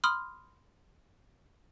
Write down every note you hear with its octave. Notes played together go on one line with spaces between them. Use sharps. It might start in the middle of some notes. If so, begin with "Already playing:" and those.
B5 C6 D#6 F6